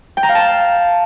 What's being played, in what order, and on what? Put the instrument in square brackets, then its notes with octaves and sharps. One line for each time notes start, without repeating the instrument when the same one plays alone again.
[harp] G5
A#5
F5
A5